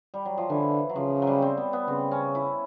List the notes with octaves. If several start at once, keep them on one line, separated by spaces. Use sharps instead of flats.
G3
F#3
F3
D3 E3
F#3
C#3 F3
F#3
G3
C4
B3
B3
C#3 C4
C#4
E4